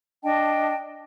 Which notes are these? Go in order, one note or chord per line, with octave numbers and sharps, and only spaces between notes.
D4 D#5 G5 A5